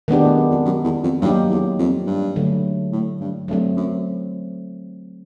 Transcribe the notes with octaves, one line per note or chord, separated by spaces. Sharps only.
D#3 G#3 B3 D4 G4
A2
F#2
F2
F#2
E2
F2
G2 F#3 A#3 D#4 G4
E2
F2
G2
D3 F#3 A3
A2
G2
G2 F#3 A3 C4
F#2